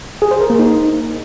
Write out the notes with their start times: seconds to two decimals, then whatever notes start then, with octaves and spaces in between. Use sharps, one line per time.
0.22 G#4
0.31 C5
0.41 A#4
0.50 A#3
0.59 D#4